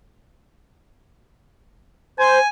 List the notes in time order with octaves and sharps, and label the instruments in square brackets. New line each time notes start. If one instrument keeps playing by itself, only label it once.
[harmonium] C5 [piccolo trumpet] G#5